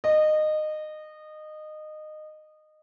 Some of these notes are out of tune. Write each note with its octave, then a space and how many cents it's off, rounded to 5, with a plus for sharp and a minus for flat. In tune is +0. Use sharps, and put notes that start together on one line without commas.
D#5 -20